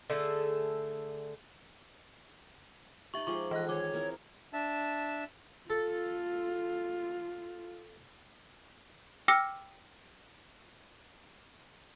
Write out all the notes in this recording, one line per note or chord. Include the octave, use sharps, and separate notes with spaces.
D3 A3 G#4 A4
D#4 G4 E5 C#6
F3 G#3 G#4 C#6 D6
E3 D#5 F#6
D#3 G#4 C#5 D6 G#6
C4 E4 A#4
D4 E5 A5
F4 A4
G5 D6 E6 F6 A#6 C#7